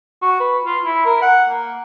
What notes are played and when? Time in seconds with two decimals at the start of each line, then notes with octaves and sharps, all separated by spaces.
0.22 F#4
0.40 B4
0.66 F4
0.85 E4
1.06 A#4
1.22 F#5
1.49 A#3